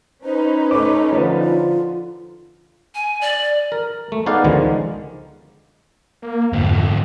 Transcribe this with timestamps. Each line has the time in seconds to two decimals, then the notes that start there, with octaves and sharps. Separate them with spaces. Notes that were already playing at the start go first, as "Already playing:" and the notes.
0.23 C#4 D#4 B4 C5
0.71 A3 C#5 D6
1.12 D3 F3
1.43 F4
2.95 G#5
3.21 D5
3.72 A#4
4.12 A3
4.26 B3 D#4 G#4 D5 F5 F#5
4.44 C#2 D3 D#3 F3 G#3
6.22 A#3
6.53 F2 G#2 D3